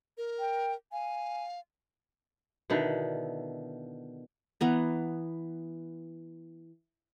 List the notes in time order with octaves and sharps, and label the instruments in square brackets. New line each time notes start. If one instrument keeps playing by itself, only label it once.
[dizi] A#4
[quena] G5
[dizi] F5 [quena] G#5
[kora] B2 D3 D#3 E4
[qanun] E3 B3 A#5